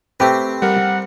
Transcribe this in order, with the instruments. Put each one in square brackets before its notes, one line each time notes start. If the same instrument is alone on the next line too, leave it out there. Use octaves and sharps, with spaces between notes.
[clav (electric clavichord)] A3 G4 B4 [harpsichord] C4
[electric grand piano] G3 A#4 [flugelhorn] F#5